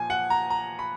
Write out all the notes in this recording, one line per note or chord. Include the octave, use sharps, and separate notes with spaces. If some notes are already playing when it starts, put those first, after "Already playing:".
Already playing: A#2 F3 G#5
F#5
A#5
A#5
B5